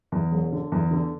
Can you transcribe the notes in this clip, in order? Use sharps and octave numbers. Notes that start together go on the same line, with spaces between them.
E2
E1
D3
E2
D3